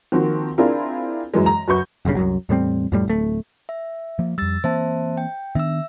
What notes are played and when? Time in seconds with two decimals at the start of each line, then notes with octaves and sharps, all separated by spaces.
0.12 D#3 F3 A#3 C4 F#4
0.58 C4 D4 E4 F4 G#4 A#4
1.34 F#2 E3 G#3
1.46 A#5
1.68 F#2 F#4 B4 C#6 G6
2.05 F#1 B1 G2 C#3
2.17 C2 F#2 F#3
2.49 E2 A2 G3 C4
2.92 F2 A2 G3
3.08 D1 A3
3.69 E5
4.19 F3 A#3
4.38 F2 G3 E6 A6
4.64 E3 A#3 C4 C5 E5 A5
5.17 G5
5.55 D#3 B3 D4 E5 E6